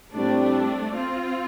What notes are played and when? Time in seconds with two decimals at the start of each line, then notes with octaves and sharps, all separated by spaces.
0.13 A2 G3 A3 C4 D4
0.94 C4 F4